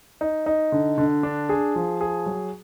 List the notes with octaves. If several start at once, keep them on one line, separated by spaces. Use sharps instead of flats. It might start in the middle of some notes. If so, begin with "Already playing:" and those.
D#4
D#4
D3
D3
D4
G#4
F3
G#4
F#3